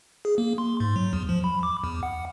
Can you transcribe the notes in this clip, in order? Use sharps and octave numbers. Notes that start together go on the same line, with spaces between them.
G#4
A#3
C6
G#2
F#3
E2
F3
B5
D6
E2
F#5